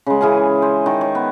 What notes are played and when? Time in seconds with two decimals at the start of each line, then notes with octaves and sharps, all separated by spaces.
0.06 C#3 G#3
0.21 E3 G#4 F5 G#5
0.62 C5
0.86 D#3
1.01 C#5
1.15 B3